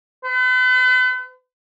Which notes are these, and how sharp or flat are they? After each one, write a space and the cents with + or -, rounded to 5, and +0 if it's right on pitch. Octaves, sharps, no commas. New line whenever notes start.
B4 +45